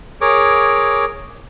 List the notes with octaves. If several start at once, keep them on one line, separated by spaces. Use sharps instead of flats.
G#4 A#4 C#5 D6